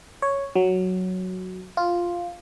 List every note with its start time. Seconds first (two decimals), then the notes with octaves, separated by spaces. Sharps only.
0.22 C#5
0.56 F#3
1.77 F4